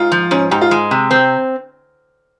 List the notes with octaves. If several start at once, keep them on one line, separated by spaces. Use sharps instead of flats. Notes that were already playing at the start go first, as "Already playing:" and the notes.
Already playing: G#2 F4
F3
G#2 C#4
G#2 G4
F4
G#3
C3
C4